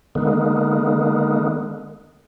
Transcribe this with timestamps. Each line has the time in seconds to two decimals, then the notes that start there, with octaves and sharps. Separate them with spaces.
0.15 D3 D#3 G#3 A#3 B3